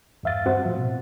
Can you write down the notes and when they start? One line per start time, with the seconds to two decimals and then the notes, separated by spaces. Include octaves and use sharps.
0.23 E2 G2 E5 F5 A6
0.45 G2 C4 F#4 C5 F#5
0.66 A2 F3
0.78 B2